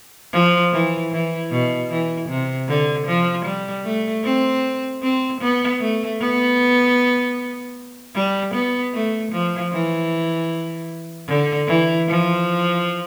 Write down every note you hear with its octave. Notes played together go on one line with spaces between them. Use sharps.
F3
E3
E3
B2
E3
C3
D3
F3
G3
A3
C4
C4
B3
A3
B3
G3
B3
A3
F3
E3
D3
E3
F3